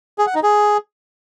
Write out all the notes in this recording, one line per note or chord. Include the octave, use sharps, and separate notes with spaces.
G#4
F#5
D#4
G#4